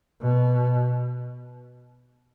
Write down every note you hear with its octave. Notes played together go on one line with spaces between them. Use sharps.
B2